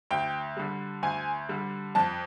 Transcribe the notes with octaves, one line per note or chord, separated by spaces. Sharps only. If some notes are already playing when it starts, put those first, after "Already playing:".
D2 G5
D3 G3
D2 G#5
D3 G3
F2 A5